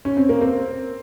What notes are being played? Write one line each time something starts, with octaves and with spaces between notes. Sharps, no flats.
C#4
C4
A#3
C4